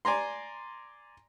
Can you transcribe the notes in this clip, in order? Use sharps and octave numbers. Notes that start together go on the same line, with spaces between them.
D5 G#5 A#5 C6